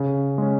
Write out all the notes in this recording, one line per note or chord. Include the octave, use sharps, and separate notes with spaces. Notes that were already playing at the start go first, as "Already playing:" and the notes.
Already playing: C#3
G#3 C#4